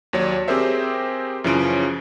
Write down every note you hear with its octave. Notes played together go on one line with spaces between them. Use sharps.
D#2 F#3 C#5 D5
C4 G4 G#4 A#4 C5 E5
F#2 C#3 E3 F3 C#4 D7